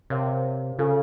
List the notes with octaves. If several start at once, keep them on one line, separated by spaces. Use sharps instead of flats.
C3 A#4 C#5 F5
C#3 F4 A4 C5 F5 G#5